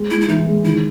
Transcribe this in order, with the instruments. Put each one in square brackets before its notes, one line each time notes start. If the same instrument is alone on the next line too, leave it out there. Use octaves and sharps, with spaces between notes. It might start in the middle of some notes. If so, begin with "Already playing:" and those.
Already playing: [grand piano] G#3
[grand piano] G#3 [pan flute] E4
[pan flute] E4
[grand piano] E3 [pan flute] D#4
[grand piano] G#3
[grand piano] D#3 [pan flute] E4